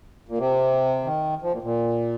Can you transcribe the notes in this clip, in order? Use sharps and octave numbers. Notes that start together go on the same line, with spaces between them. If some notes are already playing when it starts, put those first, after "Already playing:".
A#2
C3
D#3
F3
A#2
A#2